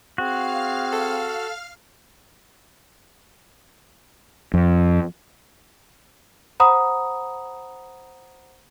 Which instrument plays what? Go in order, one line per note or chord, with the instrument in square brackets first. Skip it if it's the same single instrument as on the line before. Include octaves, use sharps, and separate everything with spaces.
[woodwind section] C4 G#4 [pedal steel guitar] F#4 [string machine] F5 F6
[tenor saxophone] A4
[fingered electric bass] F2
[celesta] C5 F#5 A#5 B5 D#6